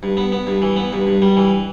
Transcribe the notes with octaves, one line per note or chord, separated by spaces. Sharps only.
G2
B3
B3
G2
E3
B3
G2
G2
G3
E3